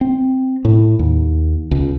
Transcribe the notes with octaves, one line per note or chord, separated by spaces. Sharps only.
C4
A2
D#2
C#2